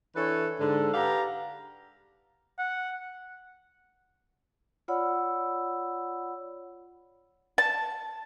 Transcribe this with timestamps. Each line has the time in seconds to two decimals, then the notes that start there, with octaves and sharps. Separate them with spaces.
0.16 E3 D4 A4 B4 C#5
0.60 G#2 D3 A4
0.94 G4 B4 D5 F5 F#5 A#5
2.58 F#5
4.88 F4 C#5 D5 F#5 B5 E6
7.58 A5